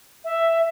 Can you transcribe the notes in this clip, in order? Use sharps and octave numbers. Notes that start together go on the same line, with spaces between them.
E5